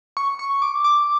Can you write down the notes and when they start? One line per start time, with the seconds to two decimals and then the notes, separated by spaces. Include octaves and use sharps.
0.17 C#6
0.39 C#6
0.62 D6
0.84 D6